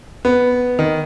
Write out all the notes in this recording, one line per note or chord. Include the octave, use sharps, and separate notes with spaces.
B3
D#3